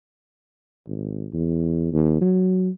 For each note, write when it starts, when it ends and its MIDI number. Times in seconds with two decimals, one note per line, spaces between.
0.87 1.26 32
1.33 1.90 40
1.92 2.20 39
2.21 2.69 54